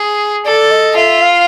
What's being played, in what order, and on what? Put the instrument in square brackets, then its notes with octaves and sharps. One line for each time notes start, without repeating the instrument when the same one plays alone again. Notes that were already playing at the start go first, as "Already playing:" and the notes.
Already playing: [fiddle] G#4
[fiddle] A4 [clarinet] D5
[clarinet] D#5
[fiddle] F4 [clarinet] E5
[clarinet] F5